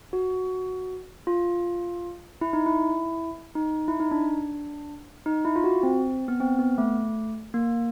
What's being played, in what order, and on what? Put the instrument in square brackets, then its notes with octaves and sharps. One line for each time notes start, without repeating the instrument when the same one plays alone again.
[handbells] F#4
F4
E4
D#4
E4
D#4
E4
D#4
D4
D#4
E4
F4
F#4
C4
B3
C4
B3
A3
A#3